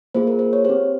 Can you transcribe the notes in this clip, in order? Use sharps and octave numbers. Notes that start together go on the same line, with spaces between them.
A#3 F4 G#4 C5
A#4
C5
C#5
C4 G4 C5